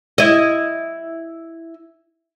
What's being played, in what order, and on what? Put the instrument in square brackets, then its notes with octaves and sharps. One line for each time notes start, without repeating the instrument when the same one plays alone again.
[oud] E4 D#5